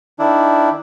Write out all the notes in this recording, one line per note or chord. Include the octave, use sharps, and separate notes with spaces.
D#3 D4 E4